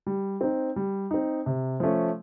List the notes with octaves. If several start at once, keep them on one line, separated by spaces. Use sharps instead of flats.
G3
C4 D#4
G3
C4 D#4
C3
F3 A3 C#4